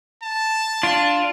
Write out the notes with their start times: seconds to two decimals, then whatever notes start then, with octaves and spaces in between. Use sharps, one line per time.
0.23 A5
0.83 D4 F4